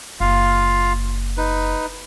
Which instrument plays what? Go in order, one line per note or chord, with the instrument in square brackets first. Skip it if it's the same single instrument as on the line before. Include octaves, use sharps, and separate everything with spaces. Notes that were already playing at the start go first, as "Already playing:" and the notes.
[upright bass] F#1 [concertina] F4 F5
[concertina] D#4 B4